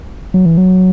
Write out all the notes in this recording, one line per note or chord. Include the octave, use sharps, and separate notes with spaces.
F#3
E3
F#3